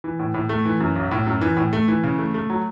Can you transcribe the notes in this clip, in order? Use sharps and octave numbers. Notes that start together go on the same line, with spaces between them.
E3
A2
A2
A3
E3
F#2
B1
A2
F#2
E3
A2
A3
E3
C#3
A3
A3
F#3